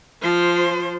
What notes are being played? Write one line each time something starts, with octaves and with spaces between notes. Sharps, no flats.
F3 C5